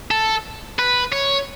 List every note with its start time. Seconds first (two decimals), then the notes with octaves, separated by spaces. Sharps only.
0.11 A4
0.79 B4
1.13 C#5